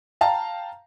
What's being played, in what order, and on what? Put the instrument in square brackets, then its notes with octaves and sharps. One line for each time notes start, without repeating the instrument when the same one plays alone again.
[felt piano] F5 G5 A5 A#5